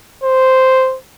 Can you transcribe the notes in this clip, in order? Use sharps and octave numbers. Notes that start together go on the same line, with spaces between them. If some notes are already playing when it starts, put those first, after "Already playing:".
C5